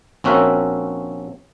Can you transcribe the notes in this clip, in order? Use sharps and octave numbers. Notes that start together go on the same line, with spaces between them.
A#1 C4 C#4 F#4 A#4 E5